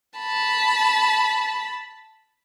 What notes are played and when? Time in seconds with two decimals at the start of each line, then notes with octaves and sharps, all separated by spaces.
0.19 A5 B5